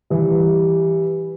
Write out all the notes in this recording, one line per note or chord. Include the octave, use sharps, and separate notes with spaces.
E3 G3